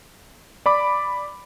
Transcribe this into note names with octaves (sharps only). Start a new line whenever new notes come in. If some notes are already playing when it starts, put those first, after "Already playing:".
D5 B5 D6